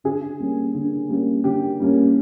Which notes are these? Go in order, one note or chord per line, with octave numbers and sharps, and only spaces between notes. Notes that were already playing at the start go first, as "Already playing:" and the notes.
D3 G#4
G3 A#3 C#4
D3
G3 A#3 C#4
D3 G4
G3 A#3 C#4